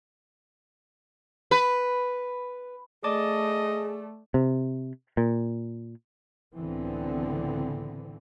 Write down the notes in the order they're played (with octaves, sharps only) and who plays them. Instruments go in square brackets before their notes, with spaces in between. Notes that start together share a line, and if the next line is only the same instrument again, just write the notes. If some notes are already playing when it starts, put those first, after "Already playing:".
[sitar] B4
[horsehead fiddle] A3 [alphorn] G#4 [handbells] D5 A5 D6 [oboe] D#5
[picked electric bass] C3
A#2
[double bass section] C#2 A2 D3 E3 B3 C4